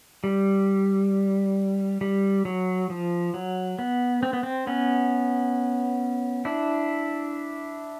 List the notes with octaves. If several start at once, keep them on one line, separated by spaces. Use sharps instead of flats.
G3
G3
F#3
F3
F#3
B3
C4
B3
C4
B3 C#4
D4 E4